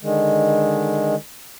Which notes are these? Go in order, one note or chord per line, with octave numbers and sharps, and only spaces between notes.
D3 D#3 G#3